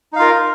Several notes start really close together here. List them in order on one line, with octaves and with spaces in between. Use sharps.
D#4 F5 F4 A#4